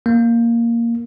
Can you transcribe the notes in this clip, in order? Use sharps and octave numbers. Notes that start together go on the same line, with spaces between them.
A#3